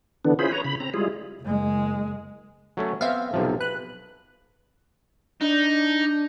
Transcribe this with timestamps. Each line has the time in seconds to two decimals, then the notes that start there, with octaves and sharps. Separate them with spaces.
0.25 D3 E3 B3 D4
0.39 C#4 E4 F4 G#4 C5 B5
0.52 B4 C#5 A#5
0.64 C#3 B5
0.80 C4 A#5
0.94 G3 G#3 E4 F4 G#4
1.42 F#1 G#3
2.77 F#3 A3 C#4
3.01 B3 C4 E5 F5
3.33 B1 C3 F3
3.60 B4 F#6
5.41 D4 D#4